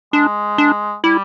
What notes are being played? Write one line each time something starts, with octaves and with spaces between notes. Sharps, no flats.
G#3 D4
D4
G3 E4